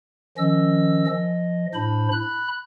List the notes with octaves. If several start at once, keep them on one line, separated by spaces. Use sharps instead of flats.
D#3 F3 C#4 D#5 E6
F3 D#5
A2 D4 C5 B5
B5 F#6